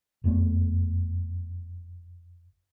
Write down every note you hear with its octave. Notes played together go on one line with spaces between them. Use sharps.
F#1 F2 A3 B3